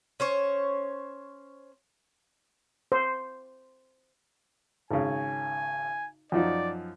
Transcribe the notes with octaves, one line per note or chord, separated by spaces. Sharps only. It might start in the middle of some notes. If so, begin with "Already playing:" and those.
C#4 C5 C#5
C5
G#1 C#3 G#5
F#2 F3 D#4 D5